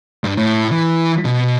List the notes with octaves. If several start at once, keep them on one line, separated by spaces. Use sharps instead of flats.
G2
A2
E3
B2